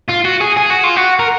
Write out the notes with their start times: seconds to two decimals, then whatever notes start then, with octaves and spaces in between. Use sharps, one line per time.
0.09 F4
0.25 F#4
0.41 G#4
0.57 G#4
0.70 F#4
0.84 F4
0.97 F#4
1.19 A#4